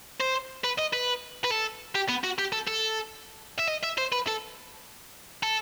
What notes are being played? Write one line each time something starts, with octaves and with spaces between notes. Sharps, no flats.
C5
B4
D#5
B4
B4
A4
G4
B3
F#4
G4
A4
A4
E5
D#5
E5
C5
B4
A4
A4